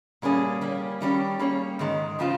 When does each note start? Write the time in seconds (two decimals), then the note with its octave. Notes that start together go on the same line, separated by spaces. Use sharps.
0.22 A#2 G3 A#3 C#4 G#4
0.61 G3 A#3 C#4
1.01 D#3 G3 C#4 G4
1.39 G3 A#3 C#4 G#4 C#5
1.79 G#2 D#3 G#3
2.19 C#3 F3 C4 F4